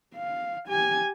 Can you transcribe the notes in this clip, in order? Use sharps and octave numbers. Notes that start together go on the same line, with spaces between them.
F5
G4 G#5